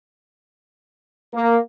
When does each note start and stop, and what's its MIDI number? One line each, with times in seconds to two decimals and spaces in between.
1.34 1.58 58